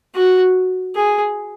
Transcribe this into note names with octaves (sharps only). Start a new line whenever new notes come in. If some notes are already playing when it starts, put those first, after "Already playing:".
F#4
G#4